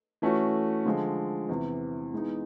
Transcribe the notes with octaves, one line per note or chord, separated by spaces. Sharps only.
E3 A3 C#4 F#4
D3 F3 G#3
E2 C3 E3
E3 G#3 B3 D#4